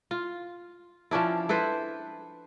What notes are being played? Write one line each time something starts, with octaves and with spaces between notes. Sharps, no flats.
F4
F3 C#4 D4 E4
E4 A4 B4 C5